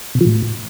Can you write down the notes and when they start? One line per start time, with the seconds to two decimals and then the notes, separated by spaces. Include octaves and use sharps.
0.15 B2
0.21 F3
0.26 A2